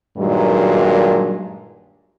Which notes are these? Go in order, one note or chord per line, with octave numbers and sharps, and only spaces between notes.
G2 A#2 D#3 F#3 G#3